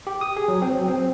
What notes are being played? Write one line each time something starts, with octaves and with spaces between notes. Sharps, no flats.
G4
D#6
G#4
F#3
C4
F#3
C4